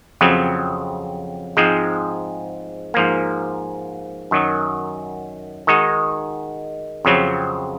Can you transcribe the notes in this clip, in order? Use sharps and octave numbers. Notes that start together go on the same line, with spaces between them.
F2 C#3 F#3 C4
G#2 F3 G#3 C4
G#2 F3 A#3
F#2 D#3 F#3
D#3 G#3 D#4 F#4
F2 C#3 F#3 C4